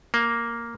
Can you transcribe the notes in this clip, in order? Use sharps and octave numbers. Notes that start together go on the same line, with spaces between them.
A#3